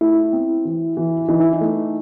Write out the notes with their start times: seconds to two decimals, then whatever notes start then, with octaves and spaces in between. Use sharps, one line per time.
0.01 A3 E4
0.33 C4
0.65 E3
0.97 E3
1.28 E3 D#4
1.40 E4
1.53 D#4
1.61 A3